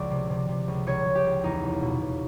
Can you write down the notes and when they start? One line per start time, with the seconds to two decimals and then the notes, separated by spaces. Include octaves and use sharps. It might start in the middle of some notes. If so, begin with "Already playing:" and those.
Already playing: C#2 F3 D5
0.11 C3
0.30 C3
0.49 C3
0.68 C#2
0.86 C#2 C#5
1.06 C#2
1.15 G4
1.24 C#2
1.44 E2 D#4
1.63 F1
1.82 B2
2.02 B2